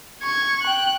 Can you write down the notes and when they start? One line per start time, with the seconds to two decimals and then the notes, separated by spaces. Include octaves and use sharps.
0.22 C#6 G#6
0.63 G5 F#6